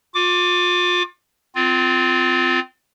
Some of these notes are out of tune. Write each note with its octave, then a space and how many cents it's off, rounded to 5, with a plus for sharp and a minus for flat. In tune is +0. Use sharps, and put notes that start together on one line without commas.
F4 +35 D6 -5
C4 -25 F4 +0